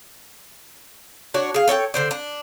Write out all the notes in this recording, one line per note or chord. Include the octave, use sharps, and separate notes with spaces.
D4 F#4 C#5
G#4 F5
A4 C#5 D#5 G5
D3 C5 D5
D4